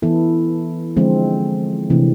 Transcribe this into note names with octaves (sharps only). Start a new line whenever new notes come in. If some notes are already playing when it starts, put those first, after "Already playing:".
E3 B3 E4 A4
D3 F3 G#3 C4
C3 E3 A3 D4